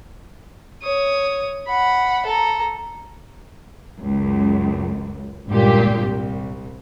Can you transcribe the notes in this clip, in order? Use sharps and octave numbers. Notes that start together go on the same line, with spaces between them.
C#5 D#6
F#5 B5
A4 A#5
C#2 F#2
G#1 C#2 G2 A#2 G4
C2